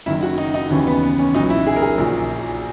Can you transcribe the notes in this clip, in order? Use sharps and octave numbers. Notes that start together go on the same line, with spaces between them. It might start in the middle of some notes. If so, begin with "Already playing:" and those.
F#1 F#2 D#3 F#3 E4
F#4
D#4
D#4
D#2 C#3 E3 C#4
B3
B3
C#4
B1 A#2 F#3 D#4
E4
G#4
A#4
G#4
A#1 A#2 F#3